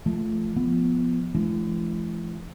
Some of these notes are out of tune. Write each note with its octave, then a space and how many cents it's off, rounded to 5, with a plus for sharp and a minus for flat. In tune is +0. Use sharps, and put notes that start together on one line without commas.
F3 -20 A3 -5
F3 +0 B3 +0
E3 +45 A3 -45 D4 +0